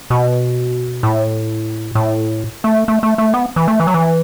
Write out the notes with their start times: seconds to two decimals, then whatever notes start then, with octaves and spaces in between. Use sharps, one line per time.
0.10 B2
1.03 A2
1.95 A2
2.64 A3
2.88 A3
3.03 A3
3.18 A3
3.34 B3
3.56 E3
3.68 A3
3.80 E3
3.87 F#3
3.94 E3